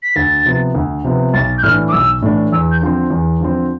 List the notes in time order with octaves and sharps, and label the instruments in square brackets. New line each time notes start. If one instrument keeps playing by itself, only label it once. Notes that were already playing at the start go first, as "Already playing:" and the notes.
[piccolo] B6
[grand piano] D2 [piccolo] A6
[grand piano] C3 F3 B3
D2
C3 F3 B3
[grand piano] B1 [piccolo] A6
[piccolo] G6
[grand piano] A2 E3 A3 D4 [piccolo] F6
[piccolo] D6
[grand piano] B1 [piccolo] E6
[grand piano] A2 E3 A3 D4
[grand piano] E2 [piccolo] E6
[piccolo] G6
[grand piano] D3 F3 C4
E2
D3 F3 C4